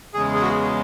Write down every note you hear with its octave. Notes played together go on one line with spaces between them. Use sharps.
E2 C#3 G#3 G#4
G#4
F#4